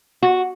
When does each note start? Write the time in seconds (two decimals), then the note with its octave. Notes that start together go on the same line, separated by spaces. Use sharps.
0.22 F#4